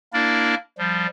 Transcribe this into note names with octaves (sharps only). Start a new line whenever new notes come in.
A#3 D4 E4 A#4 D5
F3 G3